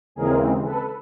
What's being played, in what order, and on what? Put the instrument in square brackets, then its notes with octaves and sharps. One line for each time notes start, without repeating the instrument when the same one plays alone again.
[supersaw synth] D#2 C#3 E3 G#3 C4 G#4 A#4
A4 B4